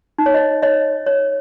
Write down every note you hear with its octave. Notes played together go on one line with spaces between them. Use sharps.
D#4
C#5
D#5
C#5 D#5
C#5